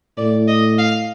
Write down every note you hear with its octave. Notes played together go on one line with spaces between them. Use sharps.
A2 D5
D#5
F5